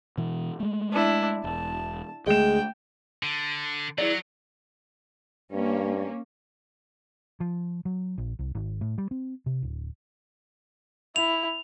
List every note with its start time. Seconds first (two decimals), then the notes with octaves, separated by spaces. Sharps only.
0.18 B2 E3
0.60 G#3 A3
0.92 D4 E4
1.44 E1 A5
2.26 D2 G#3 A3 G5 E7
3.23 D3
3.98 F#3 E4 G#4 D5
5.52 G2 A#3 C#4
7.40 F3
7.85 F#3
8.18 A#1
8.39 C2
8.55 G#1
8.81 A2
8.98 G3
9.11 C4
9.46 C3
9.63 D1
11.16 E4 F7